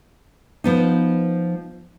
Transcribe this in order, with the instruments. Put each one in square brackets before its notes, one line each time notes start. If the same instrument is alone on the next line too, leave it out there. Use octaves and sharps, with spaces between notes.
[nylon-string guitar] F3 B3 D#4